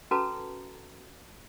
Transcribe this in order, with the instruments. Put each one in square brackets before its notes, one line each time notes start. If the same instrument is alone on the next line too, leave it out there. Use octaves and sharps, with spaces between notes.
[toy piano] C#4 F#4 A4 B4 A5 A#5